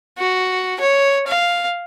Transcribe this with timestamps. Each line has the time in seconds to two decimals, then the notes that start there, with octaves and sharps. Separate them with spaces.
0.18 F#4
0.80 C#5
1.27 F5